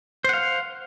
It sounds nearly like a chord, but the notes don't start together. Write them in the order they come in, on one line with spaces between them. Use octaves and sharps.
C5 F#5 F5